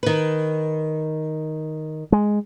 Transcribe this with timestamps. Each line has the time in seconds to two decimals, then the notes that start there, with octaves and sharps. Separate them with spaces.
0.03 D#3 B4
2.12 G#3